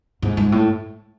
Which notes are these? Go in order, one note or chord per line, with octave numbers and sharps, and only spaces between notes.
G#2
G#2
A2